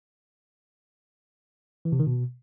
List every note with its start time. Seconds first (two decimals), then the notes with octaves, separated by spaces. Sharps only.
1.85 E3
1.92 C3
1.99 D#3
2.07 B2